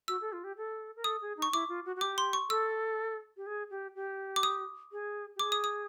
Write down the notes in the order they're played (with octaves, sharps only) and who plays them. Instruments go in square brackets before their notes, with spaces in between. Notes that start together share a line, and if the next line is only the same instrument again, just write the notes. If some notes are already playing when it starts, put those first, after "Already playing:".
[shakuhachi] F#4 [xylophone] E6
[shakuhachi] A4
F4
G4
A4
A#4
[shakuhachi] A4 [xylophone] D#6
[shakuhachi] G#4
D#4
[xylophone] C#6
[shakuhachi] E4 [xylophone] D6
[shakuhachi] F4
F#4
F#4
[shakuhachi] G4 [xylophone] D6
[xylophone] C6
C#6
[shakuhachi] A4 [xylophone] E6
[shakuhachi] G4
G#4
G4
G4
[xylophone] D6
D#6
[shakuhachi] G#4
G4
[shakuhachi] G#4 [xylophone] D6
[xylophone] D#6
D#6